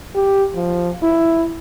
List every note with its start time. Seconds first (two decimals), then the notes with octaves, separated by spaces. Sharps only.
0.15 G4
0.55 F3
1.03 E4